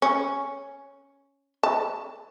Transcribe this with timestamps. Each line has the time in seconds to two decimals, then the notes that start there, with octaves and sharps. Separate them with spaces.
0.02 C#4
1.63 A5